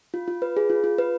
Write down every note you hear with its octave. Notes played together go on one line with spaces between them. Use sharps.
F4
F4
B4
G#4
F4
F4
B4